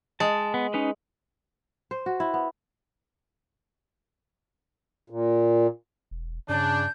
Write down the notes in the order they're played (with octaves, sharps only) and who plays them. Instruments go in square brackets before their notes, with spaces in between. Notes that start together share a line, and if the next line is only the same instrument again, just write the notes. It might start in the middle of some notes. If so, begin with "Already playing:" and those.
[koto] G#3 [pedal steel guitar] A5
[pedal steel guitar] B3
C#4 D#4 B4
[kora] C5
F#4
E4
B3
[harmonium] A#2
[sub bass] E1
[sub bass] G2 [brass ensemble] C#3 D4 [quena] G6